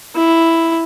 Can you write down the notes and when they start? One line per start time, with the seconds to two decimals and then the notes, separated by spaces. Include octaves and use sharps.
0.16 E4